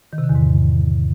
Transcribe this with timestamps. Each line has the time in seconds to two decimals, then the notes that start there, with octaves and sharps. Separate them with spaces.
0.13 D#3
0.18 C3
0.24 D3
0.29 E2
0.35 G#2